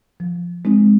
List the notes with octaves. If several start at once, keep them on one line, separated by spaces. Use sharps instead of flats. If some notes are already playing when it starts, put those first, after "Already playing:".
F3
G#3 C4 D#4